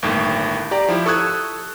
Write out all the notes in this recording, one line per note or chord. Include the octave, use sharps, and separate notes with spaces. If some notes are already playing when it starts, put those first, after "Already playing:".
G1 D#2 A2
G4 D5 A#5
F3 E4 G4
A4 C#6 D#6 E6 F#6 G#6